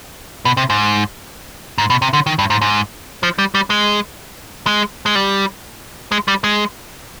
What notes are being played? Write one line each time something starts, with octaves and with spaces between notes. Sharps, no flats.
B2
C3
G#2
G#2
B2
C3
D3
D#3
G2
G#2
G#2
F3
G3
G3
G#3
G#3
G#3
G3
G#3
G3
G#3